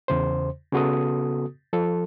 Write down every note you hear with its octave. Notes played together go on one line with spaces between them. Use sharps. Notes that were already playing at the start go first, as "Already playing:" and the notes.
E2 C#3 C5
C#3 B3 F#4 A4 D#6
F3 A4